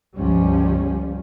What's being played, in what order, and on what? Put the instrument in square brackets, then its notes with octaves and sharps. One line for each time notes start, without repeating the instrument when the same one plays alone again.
[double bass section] G1 C#2 F3 G3 C#4